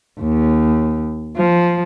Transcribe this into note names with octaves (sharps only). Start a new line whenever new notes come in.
D#2
F3